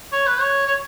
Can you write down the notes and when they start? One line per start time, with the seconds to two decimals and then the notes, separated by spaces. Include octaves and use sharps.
0.12 C#5
0.27 B4
0.41 C#5
0.67 C#5